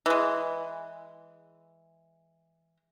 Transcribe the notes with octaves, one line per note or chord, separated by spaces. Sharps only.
E3 G#3